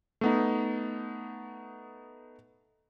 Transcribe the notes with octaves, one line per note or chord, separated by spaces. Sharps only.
A3 B3 D#4